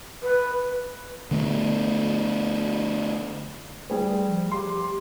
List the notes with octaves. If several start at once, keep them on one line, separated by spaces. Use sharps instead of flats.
B4
D3 A3 B3
G3 A3 G#4 C5
F3
G4 C6